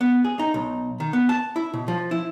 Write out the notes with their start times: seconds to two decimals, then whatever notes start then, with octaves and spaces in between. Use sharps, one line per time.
0.01 B3
0.25 G#4
0.39 D#4
0.54 B1
1.00 D#3
1.13 B3
1.29 A5
1.56 E4
1.74 B2
1.88 F3
2.11 E4